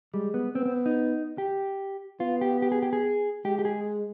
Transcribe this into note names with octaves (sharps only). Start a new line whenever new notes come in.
G3 G#3
B3
B3 C4
C4
D#4
G4
B3 F4
G4
G4
G#4
G4
G#4
G#3 G4
G4
G#4